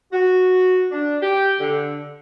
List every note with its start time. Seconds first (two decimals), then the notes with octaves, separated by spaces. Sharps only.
0.13 F#4
0.91 D4
1.22 G4
1.60 D3